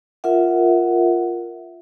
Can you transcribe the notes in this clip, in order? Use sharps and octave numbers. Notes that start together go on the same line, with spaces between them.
F4 A#4 E5 F#5